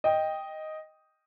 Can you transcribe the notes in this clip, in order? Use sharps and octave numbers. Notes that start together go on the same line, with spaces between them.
D#5 G5